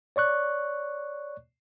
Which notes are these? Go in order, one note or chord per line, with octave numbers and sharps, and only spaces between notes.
C#5 D5 C#6 F#6